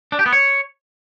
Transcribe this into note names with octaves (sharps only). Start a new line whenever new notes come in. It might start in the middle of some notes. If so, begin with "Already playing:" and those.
D4
G4
B3
C#5